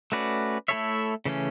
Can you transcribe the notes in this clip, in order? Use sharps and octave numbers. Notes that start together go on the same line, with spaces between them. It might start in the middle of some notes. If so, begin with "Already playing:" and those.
A3 C#4 F#4 B4 D5
A3 E4 A4 C#5 E5
C#3 E3 A3 C#4